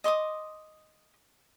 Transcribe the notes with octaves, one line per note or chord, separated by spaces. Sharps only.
D#5 C6 D6 D#6